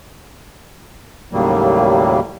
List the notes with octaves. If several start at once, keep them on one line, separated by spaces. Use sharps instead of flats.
D#2 A2 C#3 F#3 G3 A#3